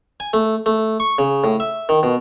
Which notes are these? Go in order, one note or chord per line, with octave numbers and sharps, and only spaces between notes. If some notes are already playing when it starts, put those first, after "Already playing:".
G#5
A3
A3
C#6
C#3
A2
E5
D#3
B2